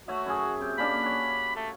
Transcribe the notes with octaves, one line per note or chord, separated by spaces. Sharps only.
A3 F#4 C#5 E5
F#2 C#4 G#4
C3 G5
A#3 C#4 D4 B5
C#5 F#5
A3